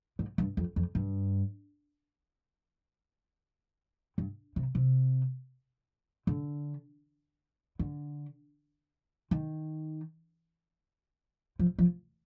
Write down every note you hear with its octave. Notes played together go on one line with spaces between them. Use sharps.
G#2
G2
F2
F2
G2
G2
C3
C3
D3
D3
D#3
F3
F3